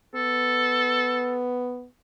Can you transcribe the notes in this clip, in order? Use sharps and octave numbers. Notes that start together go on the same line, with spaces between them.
B3 A4